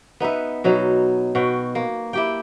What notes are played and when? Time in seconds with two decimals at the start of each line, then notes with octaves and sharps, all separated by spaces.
0.20 B3 D#4 B4 E5
0.64 B2 F#3 D#4
1.35 B2 F#4 G5
1.75 A#3
2.13 E4 G4 G5